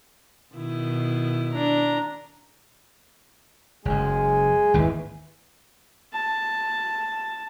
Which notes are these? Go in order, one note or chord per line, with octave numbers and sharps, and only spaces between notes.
B2 D#3 E4
D4 A#5
F#1 F#2 G#3 G#4
G#1 D#2 E3
A5